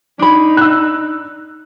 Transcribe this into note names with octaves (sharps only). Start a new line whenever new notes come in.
D4 D#4 B5
E6 F#6